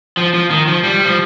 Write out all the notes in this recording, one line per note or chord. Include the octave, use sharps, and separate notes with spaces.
F3
F3
D#3
F3
G3
F3